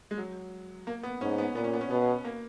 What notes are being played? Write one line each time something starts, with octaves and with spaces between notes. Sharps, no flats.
G#3
F#3
A#3
B3
G#2 C#4
B3
A#2 B3
C#4
B3
C#4
B2 B3
A#3